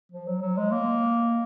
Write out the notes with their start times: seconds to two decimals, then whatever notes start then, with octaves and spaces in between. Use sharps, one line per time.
0.12 F3
0.27 F#3
0.41 F#3
0.57 G#3
0.72 A#3